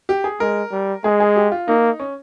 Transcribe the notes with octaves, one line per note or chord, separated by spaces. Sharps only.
G4
G#4
G#3 A#4
G3
G#3 G#4
G#4
G4
F4
A#3 D#4
C#4